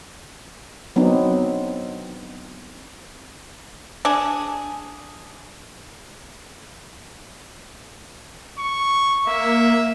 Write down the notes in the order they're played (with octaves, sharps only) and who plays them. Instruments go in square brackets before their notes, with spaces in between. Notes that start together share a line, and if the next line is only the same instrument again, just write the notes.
[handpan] F#3 B3 C4 D4 D#4
[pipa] D4 G#4
[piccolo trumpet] C#6
[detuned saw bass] A#3 [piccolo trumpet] E5